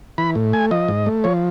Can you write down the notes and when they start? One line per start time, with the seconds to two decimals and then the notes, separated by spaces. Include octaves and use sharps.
0.18 E3 B5
0.35 A2
0.53 A3 G#5
0.71 F3 D#5
0.88 G#2
1.06 A3
1.24 F3 C#5